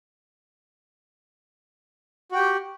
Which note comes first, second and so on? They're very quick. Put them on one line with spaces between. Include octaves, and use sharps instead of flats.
F#4 G5 G4